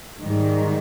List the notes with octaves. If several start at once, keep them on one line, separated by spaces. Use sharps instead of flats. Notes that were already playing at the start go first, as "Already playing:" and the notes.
G#2 D#3 G3